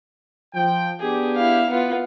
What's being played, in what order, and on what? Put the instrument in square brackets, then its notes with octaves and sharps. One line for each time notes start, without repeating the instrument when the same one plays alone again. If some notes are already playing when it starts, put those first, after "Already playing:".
[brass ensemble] F3 G5
[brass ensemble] B3 D4 G4 [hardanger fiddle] G#4
[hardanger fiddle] E4 F5
B3 F4